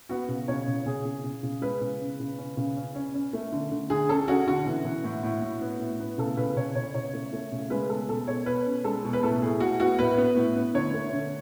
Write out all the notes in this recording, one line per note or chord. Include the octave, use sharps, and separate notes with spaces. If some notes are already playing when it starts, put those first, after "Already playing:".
B3 F#4
C#3
C#3 C#5
C#3
C#3 G#4
C#3
C#3
C#3
G#3 B4
C#3
C#4
C#3
C#4
C#3
C#4
C#4
C#4
A3
D3
D3
D3 G#4
C#4 A4
C#4 F#4
D3 F#4
E3
E3
A2
A2
A2
B3
A2
B3
C#3 A4
C#3 B4
C#3 C#5
C#3 C#5
C#3 C#5
A3
A3
C#3
G#3 B4
B2 A4
B2 A4
B2 C#5
B2 B4
C#4
G#3 A4
B2
B4
A2 A4
A2 G#4
A2 F#4
B3 F#4
A2 B4
B3
A2
B3
D3 C#5
A3
D3